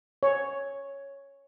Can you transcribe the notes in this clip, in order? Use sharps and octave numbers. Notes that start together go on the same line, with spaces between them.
C#5